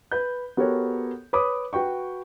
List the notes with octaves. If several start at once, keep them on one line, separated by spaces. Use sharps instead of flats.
B4 G6
B3 F#4 G4 A4 A#4 C#5
B4 C#5 B5 D6 D#6
F#4 B4 G5 C#6